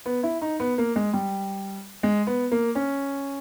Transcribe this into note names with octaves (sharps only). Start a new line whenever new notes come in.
B3
E4
D#4
B3
A#3
G#3
G3
G#3
B3
A#3
C#4